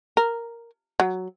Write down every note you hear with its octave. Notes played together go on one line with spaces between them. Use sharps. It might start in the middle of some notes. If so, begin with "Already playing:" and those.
A#4
F#3